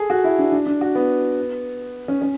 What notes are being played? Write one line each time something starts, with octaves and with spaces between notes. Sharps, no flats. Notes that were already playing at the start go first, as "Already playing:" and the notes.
Already playing: G#4 A4
F#4
E4
D4
D4
D4
F#4
B3
C#4
C#4